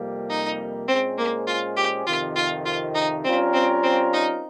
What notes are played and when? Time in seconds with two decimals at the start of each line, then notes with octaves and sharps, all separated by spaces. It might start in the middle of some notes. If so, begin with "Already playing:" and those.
Already playing: F2 C3 G3 A#3
0.30 D#4
0.88 A#2 G#3 C4 C#4 G#4 C5
1.18 A#3
1.47 F4
1.77 G4
2.06 F2 C3 D#3 F4
2.36 F4
2.65 F4
2.95 D#4
3.25 G3 C4 C#4 F4 A#4
3.54 C4
3.84 C4
4.13 D#4